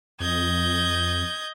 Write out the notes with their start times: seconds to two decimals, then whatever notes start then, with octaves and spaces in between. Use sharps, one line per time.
0.20 F2 D#5 G6 G#6